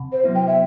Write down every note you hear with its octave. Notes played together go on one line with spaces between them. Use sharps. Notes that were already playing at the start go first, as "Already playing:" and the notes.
Already playing: C3
C5
F#3 B3 E4
G5
E5